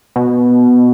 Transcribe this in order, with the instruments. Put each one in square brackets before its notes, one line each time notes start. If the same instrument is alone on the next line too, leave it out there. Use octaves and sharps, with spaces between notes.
[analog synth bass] B2